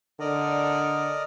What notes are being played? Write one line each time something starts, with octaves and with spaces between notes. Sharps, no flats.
D3 A#4 D5 D#5